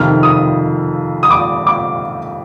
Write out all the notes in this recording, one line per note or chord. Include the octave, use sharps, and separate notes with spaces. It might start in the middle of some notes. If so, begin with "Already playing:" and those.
Already playing: F2 C3 D#3 F6
D#6
D#6
D6
D6